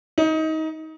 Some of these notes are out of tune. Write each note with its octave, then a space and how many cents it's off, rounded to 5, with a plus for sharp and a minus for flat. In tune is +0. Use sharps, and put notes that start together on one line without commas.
D#4 +25